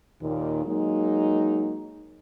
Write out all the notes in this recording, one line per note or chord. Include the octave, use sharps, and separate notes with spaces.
D#2 A#2 D#3
F#3 G#3 A#3 D#4